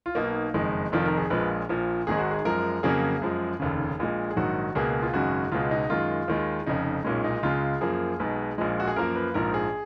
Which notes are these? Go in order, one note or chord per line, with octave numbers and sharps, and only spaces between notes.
F4
B1 B2 A#3 D#4
F#1 F2 D#3 G#3
F1 F2 D#3 F4
A#4
G#4
A#1 A#2 F3 G#3 B4
A#1 A#2 F3
G#1 G#2 D#3 G#3 G#4
F#4
G#4
F#2 F3 G#3 A#4
F2 C#3 F#3 A#3 G#4
F#2 F3 G#3
F1 D#2 C#3
A#1 A#2 G#3
G#4
A#1 G#2 D#3 F#3 F#4
C#2 B2 A#3 G#4
F4
G#1 F#2 C#3 G#3 F#4
C#2 B2 G#3 F4
D#4
F#2 D#3 G#3 F4
D#2 D#3 G#3
F1 F2 C#3 D#4
B1 A#2 G#3 C#4
D#4
C#2 C#3 G#3 F4
F#2 F3 A#3 G#4
B1 B2 G#3
A#1 A#2 F3 G#3
F#4
G#4
F#2 F3 A#3 A#4
B4
A#1 G#2 F3 A#4
G#4